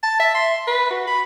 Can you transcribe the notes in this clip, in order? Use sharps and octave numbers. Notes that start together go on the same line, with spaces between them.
A5
E5
C6
B4
F#4
B5